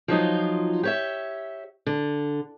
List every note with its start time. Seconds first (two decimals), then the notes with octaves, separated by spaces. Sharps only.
0.08 F3 F#3 D#4 F4
0.83 G4 C#5 E5
1.86 D3